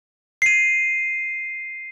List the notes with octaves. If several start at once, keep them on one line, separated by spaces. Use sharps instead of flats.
C7 D#7